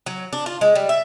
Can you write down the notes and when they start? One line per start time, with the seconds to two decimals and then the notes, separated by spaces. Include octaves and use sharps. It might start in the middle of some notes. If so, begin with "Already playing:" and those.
0.06 F#3
0.33 D4
0.46 F4
0.61 G#3
0.75 G3
0.89 E5